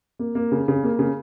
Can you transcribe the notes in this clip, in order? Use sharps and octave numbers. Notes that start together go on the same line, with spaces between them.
A#3
A#3
C#3
C#3
A#3
C#3